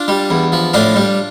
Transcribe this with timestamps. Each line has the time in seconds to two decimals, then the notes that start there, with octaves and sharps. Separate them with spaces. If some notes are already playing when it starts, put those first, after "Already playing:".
Already playing: D4 F4
0.08 G3
0.30 E2
0.52 F3
0.73 A2 D4 F4
0.95 G3